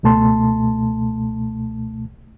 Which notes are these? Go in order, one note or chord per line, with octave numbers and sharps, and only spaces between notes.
C#2 B2 A3 A5 C6